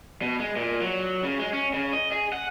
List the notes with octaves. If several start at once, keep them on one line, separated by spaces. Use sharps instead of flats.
B2
G#3
A#2
F#3
C#3
G#3
C#4
C#3
D#5
G#4
F#5